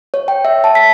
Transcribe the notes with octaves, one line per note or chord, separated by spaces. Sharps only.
C#5
G5
E5
A5
B6